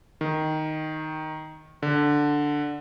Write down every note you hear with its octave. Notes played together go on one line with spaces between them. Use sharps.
D#3
D3